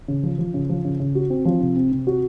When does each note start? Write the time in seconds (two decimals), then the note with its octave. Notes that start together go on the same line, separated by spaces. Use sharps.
0.08 C#3
0.23 F3
0.38 F3
0.54 C#3
0.70 F3
0.85 C#3
1.00 C#3
1.15 F#4
1.30 C4
1.45 F3
1.61 C3
1.76 C4
1.91 C3
2.07 F#4